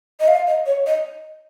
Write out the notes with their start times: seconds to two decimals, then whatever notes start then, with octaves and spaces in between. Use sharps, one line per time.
0.20 D#5
0.28 F5
0.47 D#5
0.66 C#5
0.86 D#5